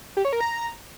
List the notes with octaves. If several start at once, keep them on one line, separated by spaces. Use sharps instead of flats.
G4
C#5
A#4
A#5